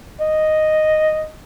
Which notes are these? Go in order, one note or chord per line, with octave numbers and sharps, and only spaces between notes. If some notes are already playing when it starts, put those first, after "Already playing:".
D#5